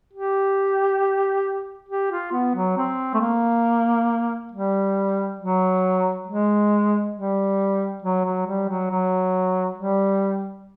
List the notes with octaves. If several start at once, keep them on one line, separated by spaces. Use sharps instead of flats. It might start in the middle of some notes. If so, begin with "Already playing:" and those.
G4
G4
F4
B3
F#3
C4
A3
A#3
G3
F#3
G#3
G3
F#3
F#3
G3
F#3
F#3
G3